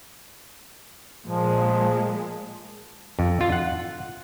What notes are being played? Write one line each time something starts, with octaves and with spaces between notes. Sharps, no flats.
A#2 F3 G#3
F2
F4
F#5